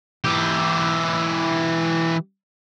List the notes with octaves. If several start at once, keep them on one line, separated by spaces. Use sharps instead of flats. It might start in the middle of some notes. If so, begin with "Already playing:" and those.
E3 G4